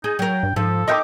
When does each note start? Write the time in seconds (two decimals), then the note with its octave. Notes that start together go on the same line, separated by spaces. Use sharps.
0.04 D#4 G#4
0.19 F#3 A#4 G5
0.43 G2
0.56 G#2 F3 A4
0.88 D#4 A#4 D#5 E5 G5 D6